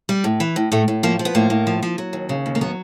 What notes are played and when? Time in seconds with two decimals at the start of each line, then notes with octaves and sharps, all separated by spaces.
0.09 G3
0.24 A2
0.40 E3
0.56 A2
0.72 A2 A3
0.88 A2
1.03 F3 A#3
1.19 F3
1.25 B3
1.35 A2 A#3
1.50 A2
1.67 F3
1.83 F3
1.98 F#3
2.13 D#2
2.29 C#3
2.46 D#2
2.55 A#3
2.61 F#3 B3